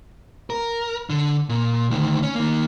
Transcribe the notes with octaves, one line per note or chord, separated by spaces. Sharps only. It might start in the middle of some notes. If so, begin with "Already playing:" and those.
A#4
D3
A#2
D2 D#3
C#4
D#3 A#3